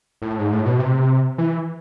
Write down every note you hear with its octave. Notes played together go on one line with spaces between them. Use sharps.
A2
G#2
A2
B2
C3
E3